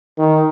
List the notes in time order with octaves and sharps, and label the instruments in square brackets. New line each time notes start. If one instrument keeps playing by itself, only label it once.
[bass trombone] D#3